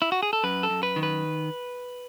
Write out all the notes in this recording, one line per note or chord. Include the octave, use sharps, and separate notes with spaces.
E4
F#4
G#4
A4
F#2 B4
A4
F#2
B4
D#3
B4